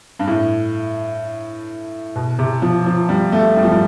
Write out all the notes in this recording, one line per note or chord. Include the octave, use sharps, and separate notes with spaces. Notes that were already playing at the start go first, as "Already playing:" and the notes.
G2
A2
B2
C3
F3
F3
G3
A3
G3
F3
G3